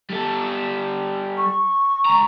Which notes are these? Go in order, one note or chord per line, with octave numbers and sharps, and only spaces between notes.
G3 A4
C#6
C#2 A#5